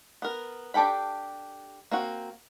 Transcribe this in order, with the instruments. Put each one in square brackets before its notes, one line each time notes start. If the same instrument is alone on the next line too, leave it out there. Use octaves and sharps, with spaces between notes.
[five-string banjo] B3 A#4
D4 G4 A4 G5 B5
A#3 C4 F#4